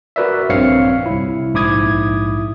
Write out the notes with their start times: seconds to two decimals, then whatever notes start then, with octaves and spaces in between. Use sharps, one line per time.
0.16 F#4 A#4 B4 D5 E5
0.50 A#1 G2 C4 C#5 F5 C#7
1.06 C2 E4
1.54 A#1 G#2 E4 D6 D#6 G#6